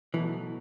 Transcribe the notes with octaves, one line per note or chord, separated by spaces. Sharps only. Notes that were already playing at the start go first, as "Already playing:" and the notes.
B2 E3 F#3 A3